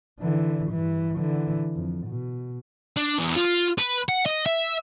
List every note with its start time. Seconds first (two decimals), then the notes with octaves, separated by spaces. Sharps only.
0.19 D3 E3
0.71 G2 E3
1.16 D3 E3
1.74 F2
2.06 B2
2.97 D4
3.19 E2
3.36 F4
3.78 B4
4.09 F#5
4.26 D#5
4.46 E5